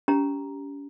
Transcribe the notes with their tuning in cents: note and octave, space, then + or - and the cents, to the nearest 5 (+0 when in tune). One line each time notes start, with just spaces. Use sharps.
C#4 +40 G4 +0 A#5 +0